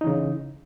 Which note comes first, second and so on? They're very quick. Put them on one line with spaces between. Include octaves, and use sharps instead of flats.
D#4 E3 C#3